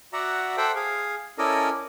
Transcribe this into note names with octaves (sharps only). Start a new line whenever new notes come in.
F#4 D5 E5 F#5 A#5
A4 C5 E5 F#5 G5
G#4 F5
C#4 E4 A4 A#4 D5 D#5